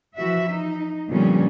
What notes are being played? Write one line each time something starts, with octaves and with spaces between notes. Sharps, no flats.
E3 F3 F#4 E5
D#4
A#2 D3 F3 G3 B3 C#4